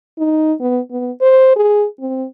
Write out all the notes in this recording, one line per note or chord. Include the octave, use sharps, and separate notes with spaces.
D#4
B3
B3
C5
G#4
C4